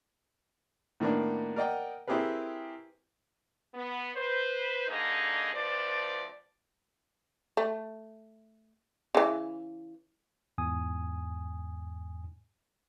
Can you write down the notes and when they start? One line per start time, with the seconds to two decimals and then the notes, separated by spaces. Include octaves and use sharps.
1.00 A2 D#3 A#3 B3 D4
1.56 A#4 D5 D#5 F#5 G5
2.08 C4 E4 G4 G#4 A#4 B4
3.74 B3
4.16 B4 C5
4.88 G2 D3 A#3 D#4 G#4 D#5
5.54 D2 F3 B4 C5 D5
7.57 A3
9.15 C#3 E3
10.58 E2 G#2 G#5 D#6